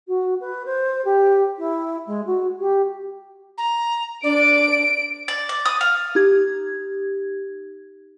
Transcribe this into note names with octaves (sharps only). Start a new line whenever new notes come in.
F#4
B4
C5
G4
E4
G#3
F#4
G4
A#5
D4 D5 D7
D5
D5
D#6
F5
D#4 G4 G#6